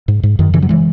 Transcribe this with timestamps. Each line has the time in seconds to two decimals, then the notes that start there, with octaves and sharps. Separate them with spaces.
0.08 G#2
0.23 G#2
0.39 F#2 D#3
0.53 C#3 E3
0.62 F#3
0.69 E3 G#3